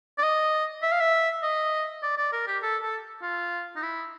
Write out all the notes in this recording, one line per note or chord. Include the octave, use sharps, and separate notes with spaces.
D5
D#5
E5
F5
E5
D#5
D5
D5
A#4
G4
A4
A4
F4
D#4
E4